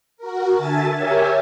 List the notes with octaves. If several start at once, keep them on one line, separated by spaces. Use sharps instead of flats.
F#4 A#4
D3 E5 G#5 A5 A6
G4 A#4 C#5 E5 G#5